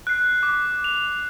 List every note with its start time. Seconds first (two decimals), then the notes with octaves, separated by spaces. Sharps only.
0.07 F#6 C7
0.43 D6 F#6
0.84 F7